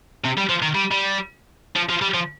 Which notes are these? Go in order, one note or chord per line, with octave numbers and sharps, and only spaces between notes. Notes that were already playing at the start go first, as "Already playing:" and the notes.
C3
G3
F3
D#3
G3
G3
F3
F3
G3
F3